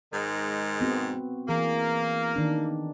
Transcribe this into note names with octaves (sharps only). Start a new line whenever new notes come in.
G#2 D#3 G#3
B3 C4 F#4
E3 A#3 G#4
D#3 D4